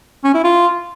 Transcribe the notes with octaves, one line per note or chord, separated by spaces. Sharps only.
C#4
E4
F4